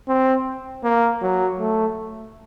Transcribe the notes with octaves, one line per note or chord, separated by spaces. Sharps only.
C4
A#3
F#3
A3